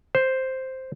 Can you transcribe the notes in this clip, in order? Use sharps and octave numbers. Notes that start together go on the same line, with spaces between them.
C5